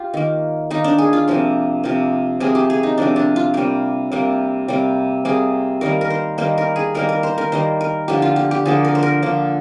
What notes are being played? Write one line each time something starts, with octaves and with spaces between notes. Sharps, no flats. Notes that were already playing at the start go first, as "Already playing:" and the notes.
Already playing: F4 G4
D#3 A#3
D#3 A#3 D#4
D4
G#4
F4
C3 F3 A#3
C3 F3 A#3
C3 F3 A#3 G#4
G4
G#4
D#4
C3 F3 A#3 D4
D4
F4
C3 G3 A#3 G4
C3 G3 A#3
C3 G3 A#3
C3 G3 A#3 G#4
D#3 G3 A#3 A#4
A#4
C5
D#3 G3 A#3 C5
A#4
G#4
D#3 G3 A#3 A#4
A#4
C5
A#4
D#3 G3 A#3 C5
A#4
D3 F3 A#3 G4
F4
G4
G4
D3 F3 A#3 G#4
A#4
C5
A#4
D3 F3 A#3